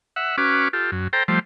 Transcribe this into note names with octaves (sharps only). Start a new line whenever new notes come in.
E5 F#5
C#4 F#4 B4 D6 F6
F4 G4 A4
F#2
A4 C5 G5 A#5
F3 G3 A3 C5